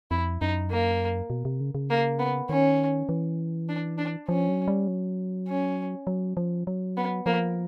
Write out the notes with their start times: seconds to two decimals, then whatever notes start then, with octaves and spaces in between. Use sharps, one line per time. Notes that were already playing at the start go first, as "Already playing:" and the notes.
0.11 F2 E4
0.41 F#2 D#4
0.71 A#3
1.30 B2
1.45 C3
1.60 C#3
1.75 C#3
1.90 A#3
2.19 B3
2.49 D#3 C#4
3.09 E3
3.69 D4
3.98 D4
4.28 F3 C#4
4.49 F#3
4.68 G3
4.88 F#3
5.48 C#4
6.07 F#3
6.37 F3
6.67 F#3
6.97 B3
7.26 F3 A#3